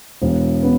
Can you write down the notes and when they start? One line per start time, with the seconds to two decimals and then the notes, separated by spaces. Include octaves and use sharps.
0.22 E1
0.63 B3